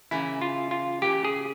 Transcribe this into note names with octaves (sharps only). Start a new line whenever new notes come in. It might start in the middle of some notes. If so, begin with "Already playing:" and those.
C#3 E3 A#3 E4
F4
F4
C#3 E3 A#3 G4
G#4